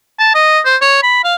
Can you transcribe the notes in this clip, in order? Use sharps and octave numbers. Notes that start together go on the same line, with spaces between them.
A5
D#5
C5
C#5
B5
F5